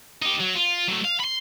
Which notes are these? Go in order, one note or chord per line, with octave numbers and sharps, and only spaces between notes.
D#4 G4
F#3
F4
F#3 A3
F5
B5 C6